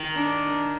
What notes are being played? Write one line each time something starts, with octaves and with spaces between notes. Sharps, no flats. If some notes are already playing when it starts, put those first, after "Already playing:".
Already playing: D#3
D4